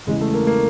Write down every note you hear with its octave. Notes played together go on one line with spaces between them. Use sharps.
E2 C#3 E3 G#3
A3
A#3
A#3